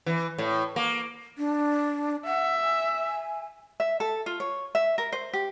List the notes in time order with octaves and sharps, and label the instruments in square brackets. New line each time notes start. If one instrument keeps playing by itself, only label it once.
[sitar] E3
A2
A#3
[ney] D4
[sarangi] E5 [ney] F#5
[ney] G#5
[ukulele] E5
A4
F4
C#5
E5
A#4
C5
G4